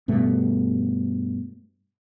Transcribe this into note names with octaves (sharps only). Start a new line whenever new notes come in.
G2 B2 A3